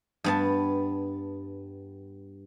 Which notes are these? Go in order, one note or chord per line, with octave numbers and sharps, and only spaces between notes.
G2 B3 A5